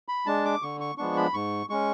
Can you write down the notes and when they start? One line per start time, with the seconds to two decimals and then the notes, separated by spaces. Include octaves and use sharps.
0.08 B5
0.26 G#3 D4 A5
0.45 D6
0.62 D3 C#6
0.80 C#6
0.98 F3 G#3 B3 D4 C#6
1.17 B5
1.34 G#2 C#6
1.70 G#3 C#4 C#6